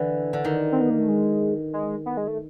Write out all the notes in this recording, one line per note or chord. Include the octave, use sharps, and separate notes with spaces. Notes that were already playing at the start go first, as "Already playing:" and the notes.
Already playing: D3 E3
D3
D#3
C4
B3
A#3
A3
G#3
G#3
B3
G#3
A3